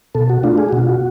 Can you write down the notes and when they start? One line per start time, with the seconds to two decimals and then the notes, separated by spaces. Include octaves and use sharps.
0.15 B2 A4
0.30 F#4
0.44 A3 D4 F4
0.58 G#4
0.69 B2 F#4
0.79 F4
0.89 F#4